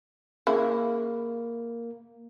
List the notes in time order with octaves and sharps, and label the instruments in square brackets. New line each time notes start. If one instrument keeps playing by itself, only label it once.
[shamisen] C#3 E4 [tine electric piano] A#3